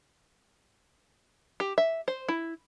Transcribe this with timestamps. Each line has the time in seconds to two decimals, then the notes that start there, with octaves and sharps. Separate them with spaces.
1.60 G4
1.78 E5
2.08 C5
2.29 E4